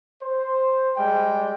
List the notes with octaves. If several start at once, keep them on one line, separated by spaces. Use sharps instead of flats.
C5
G3 G#3 G5